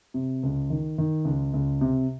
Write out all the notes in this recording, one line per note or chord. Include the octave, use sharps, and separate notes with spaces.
C3
C#2
D#3
D#3
C#2
C#2
C3